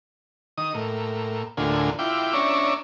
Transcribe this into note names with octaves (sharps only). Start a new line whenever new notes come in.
D#3 D#6
A2 A#3
D2 A2 D3 A#3 F4 G#5
E4 F4 G5 D6
C#4 D4 C#5 D5 E5 A#5